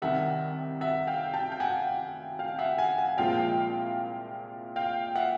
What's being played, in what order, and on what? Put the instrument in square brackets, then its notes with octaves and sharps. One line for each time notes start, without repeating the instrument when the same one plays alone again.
[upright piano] C2 C3 D#3 G3 E5 F#5
E5 F#5
F5 G5
G5 A5
G5
F#5 G#5
F5 G5
E5 F#5
F#5 G#5
F#5 G#5
C2 A#2 F3 G#3 F5 G5
F5 G5
E5 F#5